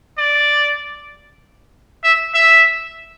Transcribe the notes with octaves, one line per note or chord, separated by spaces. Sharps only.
D5
E5
E5